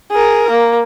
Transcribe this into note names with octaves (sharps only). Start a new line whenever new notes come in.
G#4 A#4
A#3